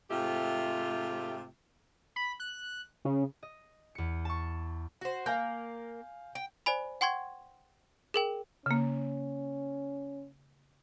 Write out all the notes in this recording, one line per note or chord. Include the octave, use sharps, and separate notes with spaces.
G#2 C3 A3 F4 G4
B5
F#6
C#3
D#5
E2 C#7
A5 C#6
F#4 C5
A#3 F5 G#5 G6
G5
C5 D5 G#5 B5
F#5 G5 C6 C#6 G#6
G#4 A#4 G5
C#3 A#3 C#4